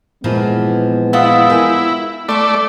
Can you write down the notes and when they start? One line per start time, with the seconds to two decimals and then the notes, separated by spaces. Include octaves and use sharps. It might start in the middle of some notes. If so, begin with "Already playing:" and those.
0.24 A#2 E3 F3 G#3 B3
1.13 E4 F4 F#5 D#6
1.49 A#4 G5 G#5
2.29 A3 D5 C6 C#6